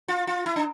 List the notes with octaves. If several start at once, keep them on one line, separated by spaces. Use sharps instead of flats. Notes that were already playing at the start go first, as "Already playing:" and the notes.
F4
F4
E4
D4